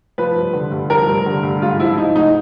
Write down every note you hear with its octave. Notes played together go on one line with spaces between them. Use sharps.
F3 B4
G2
D3
G2
F3 A#4
G2
D3
G2
G#2 F4
F3 E4
F3 D#4
G#2 D#4